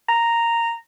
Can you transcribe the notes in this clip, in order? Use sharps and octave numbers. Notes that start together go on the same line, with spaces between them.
A#5